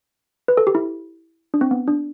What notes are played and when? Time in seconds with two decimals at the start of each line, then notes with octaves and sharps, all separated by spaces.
0.48 B4
0.57 A4
0.67 G4
0.75 E4
1.54 D4
1.61 C4
1.71 B3
1.88 D4